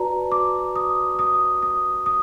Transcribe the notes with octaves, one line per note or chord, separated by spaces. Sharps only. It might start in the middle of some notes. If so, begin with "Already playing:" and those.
Already playing: F#4 B4 D5 A5 A#5
D6
D#6
D#6
D#6
D#6